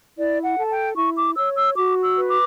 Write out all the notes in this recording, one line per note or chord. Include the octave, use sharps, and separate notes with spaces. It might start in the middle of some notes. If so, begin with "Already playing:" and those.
E4 D5
F#5
A4 A5
G5
E4 C#6
D6
C#5 E6
E6
F#4 D6
E6
B4
D6